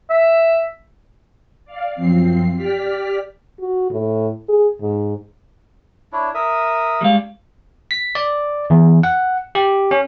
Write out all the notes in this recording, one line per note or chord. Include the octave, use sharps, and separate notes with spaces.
E5
D5 F5
F#2 F3 C4 C7
G4 D5 F6 B6
F#4
A2
G#4
G#2
D4 E4 C#5
A#4 E5 D#6
G3 G#3 F5
B6
D5
E2
F#5
G4
C#4